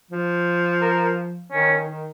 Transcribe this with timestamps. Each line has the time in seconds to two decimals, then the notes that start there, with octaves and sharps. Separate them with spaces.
0.11 F3
0.82 A#4
1.52 D#3 C#4
1.71 D#3
1.88 D#3